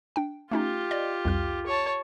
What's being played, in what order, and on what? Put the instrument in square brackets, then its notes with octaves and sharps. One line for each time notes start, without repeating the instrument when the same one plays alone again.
[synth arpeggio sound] D4 G5
[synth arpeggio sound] A3 C#4 D#4 [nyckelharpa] F4 G4
[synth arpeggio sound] D5 D#5
C2 F2 F6
[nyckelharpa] C#5 A5